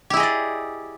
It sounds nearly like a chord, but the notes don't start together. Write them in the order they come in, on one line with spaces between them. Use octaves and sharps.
G4 E4 G#4 D#5 D5